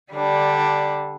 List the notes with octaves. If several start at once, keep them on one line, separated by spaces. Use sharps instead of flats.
D3 G3 D4